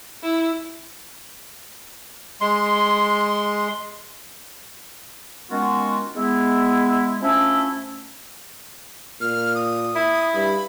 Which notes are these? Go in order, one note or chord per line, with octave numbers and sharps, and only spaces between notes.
E4
G#3 C6
D#3 G#3 B3 C#4 F4 F#4
G#3 B3 E4
F3 A3 C#4 D4 E4 A4
A#2 F6
D#6
E4
G2 B5